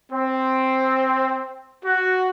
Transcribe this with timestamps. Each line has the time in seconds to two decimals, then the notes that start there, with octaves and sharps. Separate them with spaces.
0.11 C4
1.84 F#4